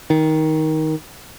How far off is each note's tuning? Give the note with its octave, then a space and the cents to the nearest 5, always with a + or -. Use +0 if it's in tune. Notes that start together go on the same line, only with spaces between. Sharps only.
D#3 +15